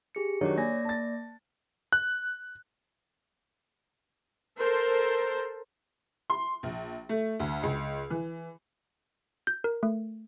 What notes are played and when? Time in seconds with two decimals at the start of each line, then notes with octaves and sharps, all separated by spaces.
0.15 G4 G#4 C#7
0.41 D#3 F#3 D4 C#5 D5
0.57 A#3 D5 G#5 A#6
0.85 A5 A6
1.93 F#6
4.59 A4 A#4 C5
6.30 C6
6.63 A#1
7.09 A3
7.40 D2
7.63 C#2
8.10 E3
9.47 G6
9.64 A#4
9.83 A3